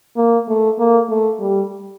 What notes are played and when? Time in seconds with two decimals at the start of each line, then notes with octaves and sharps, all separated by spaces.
0.17 A#3
0.48 A3
0.79 A#3
1.09 A3
1.40 G3